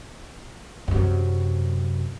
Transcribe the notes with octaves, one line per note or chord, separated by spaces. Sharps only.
F#2 C3